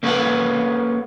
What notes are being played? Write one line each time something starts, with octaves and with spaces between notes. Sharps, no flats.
A#3 C#4 A4 B4 F5 F#5